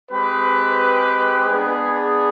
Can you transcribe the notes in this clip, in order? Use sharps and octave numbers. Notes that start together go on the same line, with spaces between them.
G#3 C4 G4 B4
B3 D4 G#4